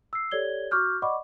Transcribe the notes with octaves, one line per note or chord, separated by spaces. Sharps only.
E6 C7
G4 A4 C#5 D5 G#6 G7
F#4 C#6 D6 F6 G6
D5 D#5 F#5 B5 C#6 D6